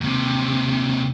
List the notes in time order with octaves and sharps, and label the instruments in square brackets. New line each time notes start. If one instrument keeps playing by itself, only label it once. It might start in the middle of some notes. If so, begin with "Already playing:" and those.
[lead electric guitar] D#2 C3